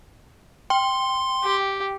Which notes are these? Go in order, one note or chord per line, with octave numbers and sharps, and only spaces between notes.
G5 C6
G4